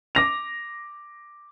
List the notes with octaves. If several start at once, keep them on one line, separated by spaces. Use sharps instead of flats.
D6 A#6 F7